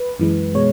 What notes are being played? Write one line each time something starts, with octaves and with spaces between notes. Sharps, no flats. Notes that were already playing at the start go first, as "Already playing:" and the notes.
Already playing: B4
F#2 E3 G#3
B2 G#3 C#5